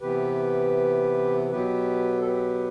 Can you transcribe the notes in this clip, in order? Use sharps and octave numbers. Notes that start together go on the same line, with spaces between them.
C3 E3 B3 G4 B4
B2 F#3 B3 G4 B4
A4
G4 B4